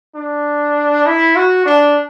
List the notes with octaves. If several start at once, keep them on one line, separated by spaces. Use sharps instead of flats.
D4
E4
F#4
D4